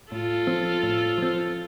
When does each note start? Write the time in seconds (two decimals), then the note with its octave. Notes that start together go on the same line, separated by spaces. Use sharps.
0.12 A2 F4 A4
0.47 F3 C4
0.83 A2
1.18 F3 C4